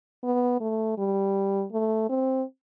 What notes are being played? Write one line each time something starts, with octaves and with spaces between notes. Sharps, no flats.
B3
A3
G3
A3
C4